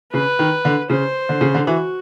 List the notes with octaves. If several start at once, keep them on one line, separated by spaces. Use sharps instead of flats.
C#3 B4
D#3
D3
C#3 C5
D3
C#3
D3
E3 F#4